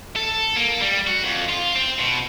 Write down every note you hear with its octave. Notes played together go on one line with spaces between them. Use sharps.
A4
A#3
G3
F#4
F2
F4
C4
B2